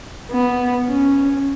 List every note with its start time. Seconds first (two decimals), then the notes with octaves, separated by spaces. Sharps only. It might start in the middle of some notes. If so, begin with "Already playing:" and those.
0.31 B3
0.88 C#4